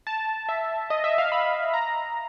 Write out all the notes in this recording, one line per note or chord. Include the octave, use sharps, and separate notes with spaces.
A5
E5
D#5
E5
F5
B5
A#5